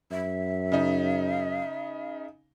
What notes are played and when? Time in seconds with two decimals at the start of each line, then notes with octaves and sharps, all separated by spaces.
0.11 F#2 E5
0.72 C#3 D#4